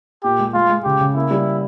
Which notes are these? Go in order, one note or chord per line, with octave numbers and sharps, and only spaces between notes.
A#2 G4
G#3
G#3 F4
G#3
C#3 G4
C#3
A#3 E4
G3